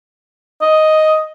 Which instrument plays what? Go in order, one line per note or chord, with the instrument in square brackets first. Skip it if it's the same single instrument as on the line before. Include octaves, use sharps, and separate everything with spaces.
[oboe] D#5